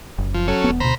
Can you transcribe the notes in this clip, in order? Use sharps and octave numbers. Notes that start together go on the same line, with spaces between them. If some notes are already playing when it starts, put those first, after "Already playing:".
F#1
F3
F#3 C#4 A4
E1 B3
D2 B2 C5 A#5 B5